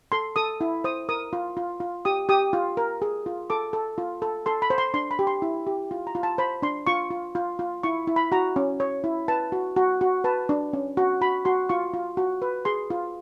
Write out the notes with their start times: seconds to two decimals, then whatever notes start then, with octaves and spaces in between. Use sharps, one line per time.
0.12 A4 C6
0.36 A4 D#6
0.61 E4
0.84 C5 D#6
1.09 A#4 D#6
1.33 F4
1.57 F4
1.80 F4
2.05 G4 D#6
2.29 G4 D#6
2.53 F4
2.77 A#4
3.02 G#4
3.26 F4
3.50 A4 D6
3.73 A4
3.98 F4
4.22 A4
4.46 A4 C6
4.62 B5
4.70 C5
4.78 C6
4.94 D4 C6
5.11 B5
5.19 G4
5.27 C6
5.42 E4
5.67 G4
5.91 F4
6.07 A#5
6.15 F4
6.23 A5
6.38 C5 B5
6.62 D4 C6
6.87 F4 C#6
7.11 F4
7.35 F4
7.59 F4
7.83 E4 C#6
8.07 E4
8.16 B5
8.32 F#4 A#5
8.56 C#4
8.80 C#5
9.04 E4
9.28 B4 A5
9.52 F#4
9.76 F#4
10.01 F#4
10.24 B4 A5
10.49 D4
10.73 C#4
10.97 F#4
11.21 F#4 B5
11.45 F#4 C6
11.69 F4 C#6
11.93 F4
12.17 F#4
12.42 B4
12.65 G#4 C6
12.90 F4